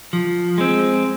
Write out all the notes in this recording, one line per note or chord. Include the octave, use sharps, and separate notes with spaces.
F3
G#3 C4